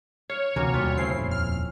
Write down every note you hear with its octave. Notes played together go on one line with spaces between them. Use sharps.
C#5 F5
D2 C3 E3 A#3 C#4 F#4
D#2 B2 G3 F4 B4 E5
C#3 A3 C4 C#4 E4 C7
D#1 F2
F6